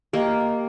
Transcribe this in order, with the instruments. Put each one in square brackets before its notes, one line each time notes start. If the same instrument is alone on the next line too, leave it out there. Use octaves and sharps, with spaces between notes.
[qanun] A#3 [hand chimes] G4 A#4 D#5 G5